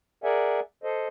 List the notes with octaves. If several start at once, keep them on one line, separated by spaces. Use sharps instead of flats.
G#4 A#4 D5 E5 F#5 G#5
A4 C5 D#5